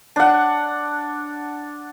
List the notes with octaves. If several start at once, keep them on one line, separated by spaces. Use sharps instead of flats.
D4 F#5